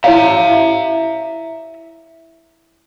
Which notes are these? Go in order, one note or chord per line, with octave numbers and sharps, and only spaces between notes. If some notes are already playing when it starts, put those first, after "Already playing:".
E4 C#5 E5 F5 A#5